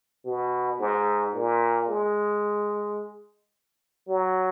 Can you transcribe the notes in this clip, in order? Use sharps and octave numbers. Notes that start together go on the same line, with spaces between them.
B2
G#2
A#2
G#3
F#3